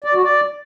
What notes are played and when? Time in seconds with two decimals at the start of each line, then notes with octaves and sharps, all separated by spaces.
0.04 D5
0.14 F#4
0.23 D5